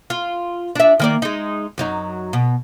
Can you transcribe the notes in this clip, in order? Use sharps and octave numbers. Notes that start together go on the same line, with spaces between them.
F4
D4 E5
D#3 A#3 D5
G#3 D#4
F#2 F#3 D#4
B2